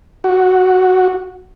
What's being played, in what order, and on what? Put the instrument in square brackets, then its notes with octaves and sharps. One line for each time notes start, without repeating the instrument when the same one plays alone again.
[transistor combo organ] F#4